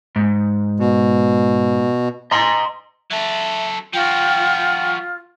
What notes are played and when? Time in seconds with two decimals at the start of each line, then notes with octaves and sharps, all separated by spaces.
0.16 G#2
0.79 B2
2.31 D#5 A#5 C6
3.11 F#3 A4 E5
3.93 F3 F4 F#4 G5